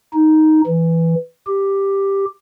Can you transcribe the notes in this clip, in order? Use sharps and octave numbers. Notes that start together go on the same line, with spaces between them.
D#4
E3
G4